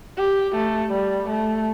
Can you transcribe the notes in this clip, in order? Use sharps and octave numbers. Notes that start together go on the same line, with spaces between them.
G4
A3
G3
A3